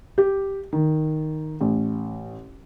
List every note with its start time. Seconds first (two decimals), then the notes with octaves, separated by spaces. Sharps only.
0.18 G4
0.73 D#3
1.61 A1